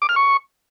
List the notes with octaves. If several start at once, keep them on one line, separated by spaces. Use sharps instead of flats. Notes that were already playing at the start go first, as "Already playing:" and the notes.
D6
F6
C#6